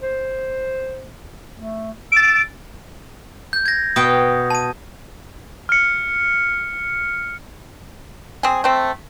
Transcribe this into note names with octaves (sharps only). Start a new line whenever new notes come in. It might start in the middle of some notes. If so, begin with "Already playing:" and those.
C5
A3
E6 A6 D7
G6
G#6 A#6
B2 G5 D#6
A5 D#7
F6 C#7
C4 G#4
A3 C4